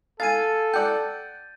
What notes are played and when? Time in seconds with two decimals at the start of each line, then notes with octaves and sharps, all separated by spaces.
0.20 A4 F5 G#5 A6 D#7
0.74 D5 F#5 G5 G6